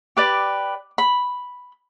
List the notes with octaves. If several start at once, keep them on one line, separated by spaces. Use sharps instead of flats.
G4 B4 D5 D6
B5